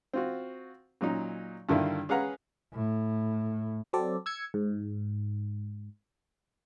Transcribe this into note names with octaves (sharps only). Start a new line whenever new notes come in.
C4 F4 F#4
A#2 F#3 C#4 D#4
G2 D3 D#3 E4 F4
C#4 G#4 B4 F5 F#5 A#5
A2
F#3 C4 A4 D5
E6 G#6 C#7
G#2